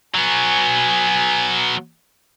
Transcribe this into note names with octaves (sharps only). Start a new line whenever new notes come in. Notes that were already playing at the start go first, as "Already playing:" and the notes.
F#3 B3 G#5